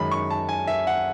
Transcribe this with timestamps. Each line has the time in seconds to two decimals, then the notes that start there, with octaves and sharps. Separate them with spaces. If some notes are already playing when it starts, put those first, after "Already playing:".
Already playing: F#2 D#3 G#3 B5
0.11 C#6
0.30 A5
0.49 G#5
0.67 E5
0.87 F#5